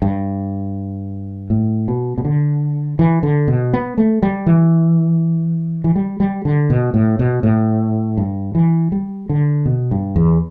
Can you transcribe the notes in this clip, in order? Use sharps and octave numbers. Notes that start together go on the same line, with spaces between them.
G2
A2
B2
B2
D3
E3
D3
B2
B3
A3
G3
E3
E3
G3
G3
D3
B2
A2
B2
A2
G2
E3
G3
D3
B2
G2
E2